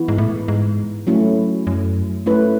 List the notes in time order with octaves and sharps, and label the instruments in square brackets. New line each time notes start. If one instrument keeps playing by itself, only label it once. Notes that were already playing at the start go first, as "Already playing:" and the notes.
Already playing: [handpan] E3 B3 E4
[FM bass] G#2
A2
G#2
[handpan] F#3 A3 C#4 E4
[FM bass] F#2
[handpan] A3 C#4 E4 B4